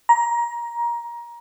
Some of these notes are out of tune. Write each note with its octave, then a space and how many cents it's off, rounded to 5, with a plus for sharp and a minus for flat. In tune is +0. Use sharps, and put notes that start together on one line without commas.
A#5 +20